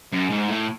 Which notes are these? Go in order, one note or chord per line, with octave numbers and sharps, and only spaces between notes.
F#2
G#2
A2